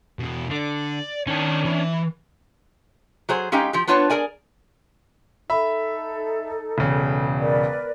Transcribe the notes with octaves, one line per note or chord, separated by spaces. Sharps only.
E2 B2
D3 D5
D#3 C#4 D4
E3
F#3 G#4 C5
G#3 C#4 D#4 G4 F5 G5
F3 G4
B3 D4 F4 B4 C#5 A5
G#4 A#4 D5 G#5
D#4 A4 E5 B5
E1 C#3
A#4 B4 D5